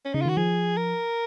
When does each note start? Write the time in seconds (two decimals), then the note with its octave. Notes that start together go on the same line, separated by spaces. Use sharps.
0.05 C#4
0.14 C#3 D#4
0.22 F4
0.26 D#3 F#4
0.37 F3 G#4
0.77 A#4